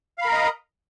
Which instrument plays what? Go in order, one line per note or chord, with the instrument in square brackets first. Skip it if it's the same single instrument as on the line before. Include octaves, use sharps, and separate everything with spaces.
[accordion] F5
B5
A#4
A#5
D#5